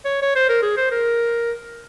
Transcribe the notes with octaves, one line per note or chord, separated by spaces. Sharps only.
C#5
C#5
C5
A#4
G#4
C5
A#4